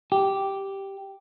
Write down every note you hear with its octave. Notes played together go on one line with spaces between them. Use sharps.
G4